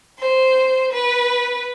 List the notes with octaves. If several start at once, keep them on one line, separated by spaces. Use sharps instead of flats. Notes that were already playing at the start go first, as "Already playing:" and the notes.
C5
B4